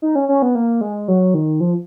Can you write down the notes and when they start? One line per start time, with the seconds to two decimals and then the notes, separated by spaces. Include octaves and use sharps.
0.02 D#4
0.15 C#4
0.29 C#4
0.42 B3
0.55 A#3
0.81 G#3
1.08 F#3
1.34 D#3
1.60 F3